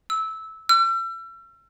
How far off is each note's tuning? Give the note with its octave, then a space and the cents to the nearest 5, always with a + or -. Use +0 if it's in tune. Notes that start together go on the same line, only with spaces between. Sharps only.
E6 -15
E6 +40